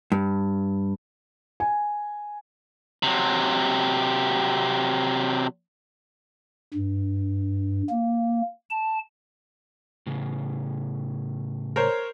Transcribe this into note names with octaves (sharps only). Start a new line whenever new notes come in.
G2
G#5
C3 F#3
G2
A#3
A5
A2 C#3
A#4 C5 C#5